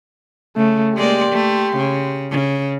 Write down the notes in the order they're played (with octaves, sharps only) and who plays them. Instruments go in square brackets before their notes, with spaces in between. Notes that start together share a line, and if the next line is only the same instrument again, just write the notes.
[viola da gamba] C#3 [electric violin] A3
[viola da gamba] G#3 A#3 D5 [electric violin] G4 C6
[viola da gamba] A3
C#3
C#3